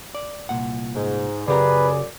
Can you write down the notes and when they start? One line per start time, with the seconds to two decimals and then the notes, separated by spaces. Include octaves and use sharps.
0.15 D5
0.49 C2 A#2 F#5
0.95 G#2
1.48 F#2 C#3 G4 G#4 B4 D5 A#5